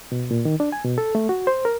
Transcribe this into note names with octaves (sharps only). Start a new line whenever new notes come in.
B2
A#2
D#3
D4
G#5
B2
A4
A3
F#4
C5
A#4